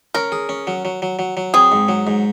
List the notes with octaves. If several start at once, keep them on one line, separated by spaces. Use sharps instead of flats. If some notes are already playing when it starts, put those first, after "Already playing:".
C#4 A#4
G#4
C#4
F#3
F#3
F#3
F#3
F#3
C4 G#4
G#2
F#3
G#2